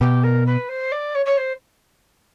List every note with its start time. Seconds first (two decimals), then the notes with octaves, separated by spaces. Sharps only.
0.01 B2 G4
0.23 A#4
0.46 B4
0.69 C5
0.92 D5
1.15 C#5
1.26 C#5
1.37 C5